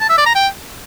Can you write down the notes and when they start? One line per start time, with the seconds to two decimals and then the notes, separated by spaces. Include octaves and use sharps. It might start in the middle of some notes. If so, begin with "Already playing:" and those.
0.01 A5
0.09 E5
0.18 D5
0.26 A#5
0.35 G5